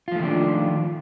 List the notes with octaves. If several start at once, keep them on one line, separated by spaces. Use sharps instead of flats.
D#3 F3 A3 D4 F4